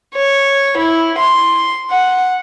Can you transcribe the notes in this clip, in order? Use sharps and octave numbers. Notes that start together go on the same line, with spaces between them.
C#5
E4
C6
F#5